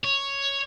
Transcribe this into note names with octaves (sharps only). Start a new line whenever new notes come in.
C#5